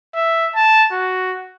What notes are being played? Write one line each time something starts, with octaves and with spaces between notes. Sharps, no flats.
E5
A5
F#4